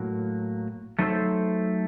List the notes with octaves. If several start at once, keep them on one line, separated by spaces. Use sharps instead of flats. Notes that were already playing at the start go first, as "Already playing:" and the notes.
Already playing: A2 F#3 A#3
F#3 A3 D#4 A4 C5